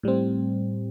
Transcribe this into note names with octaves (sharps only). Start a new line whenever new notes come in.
A2 G3 C4